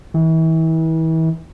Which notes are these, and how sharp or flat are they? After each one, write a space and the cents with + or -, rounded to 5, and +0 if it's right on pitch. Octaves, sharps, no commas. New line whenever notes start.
E3 -35